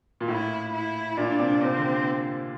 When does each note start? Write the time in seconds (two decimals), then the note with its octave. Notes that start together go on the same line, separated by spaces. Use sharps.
0.21 A#2
0.28 A2 E4
0.73 E4
1.17 A#2 D4
1.39 C3
1.62 C3 C4
1.77 D3